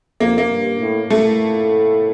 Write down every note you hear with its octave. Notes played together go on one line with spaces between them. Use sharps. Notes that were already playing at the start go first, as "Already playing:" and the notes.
F2 A#3
A#3
G2
A2
A2 A3